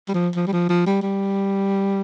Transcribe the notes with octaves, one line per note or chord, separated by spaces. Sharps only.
G3
F3
F3
G3
F3
F3
G3
G3